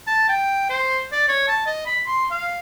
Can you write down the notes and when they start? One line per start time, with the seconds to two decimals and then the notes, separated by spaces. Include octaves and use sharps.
0.07 A5
0.29 G5
0.70 C5
1.12 D5
1.28 C#5
1.48 A5
1.66 D#5
1.86 B5
2.06 C6
2.31 F5